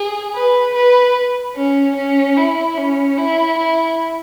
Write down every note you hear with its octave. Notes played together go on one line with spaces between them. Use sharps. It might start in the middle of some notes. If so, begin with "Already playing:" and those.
Already playing: G#4
B4
B4
C#4
C#4
E4
C#4
E4
E4